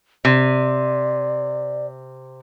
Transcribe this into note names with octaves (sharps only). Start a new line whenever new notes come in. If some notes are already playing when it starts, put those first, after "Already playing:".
C3 D5